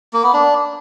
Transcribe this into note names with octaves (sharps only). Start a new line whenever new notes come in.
A#3
B3
D4